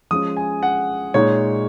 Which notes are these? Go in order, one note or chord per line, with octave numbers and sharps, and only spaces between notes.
F3 G#3 C#4 D#6
G#5
F#5
A#2 G#3 D#4 C#5